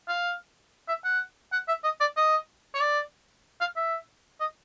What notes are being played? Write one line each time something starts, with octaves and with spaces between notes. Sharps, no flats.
F5
E5
F#5
F#5
E5
D#5
D5
D#5
C#5
D5
F5
E5
D#5